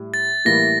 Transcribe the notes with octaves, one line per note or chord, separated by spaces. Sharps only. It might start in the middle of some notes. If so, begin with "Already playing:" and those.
Already playing: A2 G3
A6
A2 E3 G3 A#3 A#6